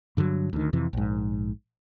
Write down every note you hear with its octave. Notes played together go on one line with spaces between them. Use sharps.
G2 D3 F3 F#3
D2 D#3
F2 C3 E3
A#1 G#2